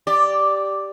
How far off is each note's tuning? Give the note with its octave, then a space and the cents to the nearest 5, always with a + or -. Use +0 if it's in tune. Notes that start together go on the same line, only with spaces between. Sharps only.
G4 +0 D5 +0